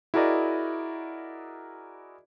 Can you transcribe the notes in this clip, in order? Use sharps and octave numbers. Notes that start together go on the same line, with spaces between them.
E4 F#4 G#4 A#4 D5 D#5